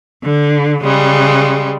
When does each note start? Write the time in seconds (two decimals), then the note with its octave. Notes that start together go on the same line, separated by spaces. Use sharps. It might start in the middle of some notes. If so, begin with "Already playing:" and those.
0.24 D3
0.81 C#3 G3 G#3